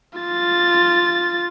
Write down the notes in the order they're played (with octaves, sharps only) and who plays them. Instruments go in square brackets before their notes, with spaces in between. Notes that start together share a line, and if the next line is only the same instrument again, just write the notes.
[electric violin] F4 A6